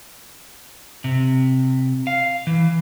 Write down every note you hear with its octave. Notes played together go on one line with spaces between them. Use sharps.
C3
F5
E3